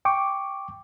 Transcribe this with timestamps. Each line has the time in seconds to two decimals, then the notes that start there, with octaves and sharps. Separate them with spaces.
0.05 G5 C#6 D6